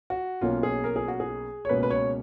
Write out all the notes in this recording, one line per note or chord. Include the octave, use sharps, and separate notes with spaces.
F#4
B1 B2 A#3 C#4 F4
G#4
A#4
G#4
F#4
G#4
C#5
C#2 B2 A#3 C#4 B4
B4
C#5